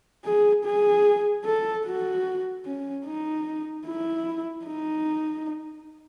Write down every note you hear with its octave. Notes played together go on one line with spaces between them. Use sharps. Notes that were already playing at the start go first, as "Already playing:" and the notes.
G#4
G#4
A4
F#4
C#4
D#4
E4
D#4